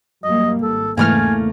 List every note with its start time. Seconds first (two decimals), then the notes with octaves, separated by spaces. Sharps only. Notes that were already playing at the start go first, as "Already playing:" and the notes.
0.24 F#2 G3 A#3 D#5
0.62 G#1 A4
0.97 E2 G#2 C#3 E3 A3 A#3 G#5 F6